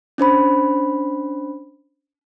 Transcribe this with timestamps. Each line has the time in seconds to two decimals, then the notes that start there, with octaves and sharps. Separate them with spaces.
0.18 C#4 D4 C5 B5